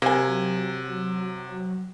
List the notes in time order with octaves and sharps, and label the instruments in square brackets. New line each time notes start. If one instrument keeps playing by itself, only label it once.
[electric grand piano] C3 [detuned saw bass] F#3 [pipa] A#3 G#5